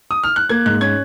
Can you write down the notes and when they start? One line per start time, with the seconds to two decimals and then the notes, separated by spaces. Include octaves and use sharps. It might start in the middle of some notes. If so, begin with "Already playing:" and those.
0.11 D#6
0.24 F6
0.36 F#6
0.49 A#3 G#6
0.66 G#2 F#6
0.81 C#4 G#6